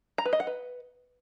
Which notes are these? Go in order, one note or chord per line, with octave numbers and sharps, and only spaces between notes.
A#5
B4
D#5
F#5
B4